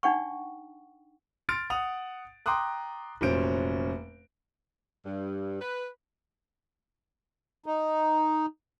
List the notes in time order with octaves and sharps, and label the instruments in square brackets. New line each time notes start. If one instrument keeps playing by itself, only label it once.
[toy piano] D4 D#4 F#5 G5 C#6
[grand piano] C6 F6 A6 D7
F#5 D#6 F7
G5 A#5 C6 D6 D#6 F#6
F1 A#2 F#3 C#4 C5 D7
[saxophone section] G2
B4
[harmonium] D#4